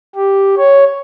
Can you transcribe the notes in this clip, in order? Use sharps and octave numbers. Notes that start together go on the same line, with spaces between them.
G4
C#5